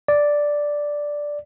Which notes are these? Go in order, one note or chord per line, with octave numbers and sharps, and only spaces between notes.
D5